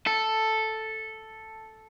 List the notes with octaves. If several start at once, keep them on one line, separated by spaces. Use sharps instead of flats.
A4